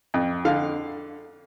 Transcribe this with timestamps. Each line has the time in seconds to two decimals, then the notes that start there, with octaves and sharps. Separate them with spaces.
0.14 F2
0.45 D3 F5